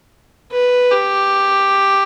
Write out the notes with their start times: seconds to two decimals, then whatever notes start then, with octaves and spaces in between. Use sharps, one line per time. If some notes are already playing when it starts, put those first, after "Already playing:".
0.52 B4
0.91 G4